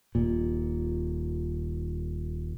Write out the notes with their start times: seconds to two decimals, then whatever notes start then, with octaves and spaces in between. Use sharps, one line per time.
0.15 D#1 A#2